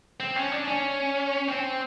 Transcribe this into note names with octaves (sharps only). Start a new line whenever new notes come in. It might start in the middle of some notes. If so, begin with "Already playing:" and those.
C4
C#4
D4
C#4
C4